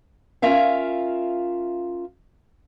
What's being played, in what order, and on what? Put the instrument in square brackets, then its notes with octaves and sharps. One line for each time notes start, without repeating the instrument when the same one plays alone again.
[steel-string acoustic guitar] C#4 F4 A#4 E5 F5